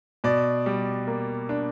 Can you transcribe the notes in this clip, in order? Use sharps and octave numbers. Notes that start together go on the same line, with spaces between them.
B2 D5
G3
A#3
D4